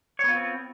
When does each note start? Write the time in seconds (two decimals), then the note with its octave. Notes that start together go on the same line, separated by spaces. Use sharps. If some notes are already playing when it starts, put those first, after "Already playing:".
0.19 C#5
0.24 B3
0.28 F4
0.33 C4